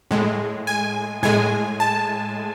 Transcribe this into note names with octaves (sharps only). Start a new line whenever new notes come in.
A2 G#3
G#5
A2 G#3 G#5
A5